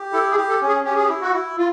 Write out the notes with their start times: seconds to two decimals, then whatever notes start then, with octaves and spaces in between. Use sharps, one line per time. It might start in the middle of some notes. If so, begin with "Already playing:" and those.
Already playing: G4
0.12 E4 A4
0.30 G#4
0.37 G4
0.49 A4
0.61 C#4
0.67 G#4
0.84 C#4 G4
0.95 G#4
1.04 G4
1.09 E4
1.21 F#4
1.33 E4
1.57 F4